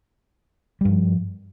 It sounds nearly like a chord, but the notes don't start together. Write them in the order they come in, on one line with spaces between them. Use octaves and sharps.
G3 G2 F3